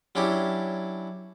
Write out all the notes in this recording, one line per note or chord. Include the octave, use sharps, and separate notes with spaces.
F#3 C#4 D4 E4 G4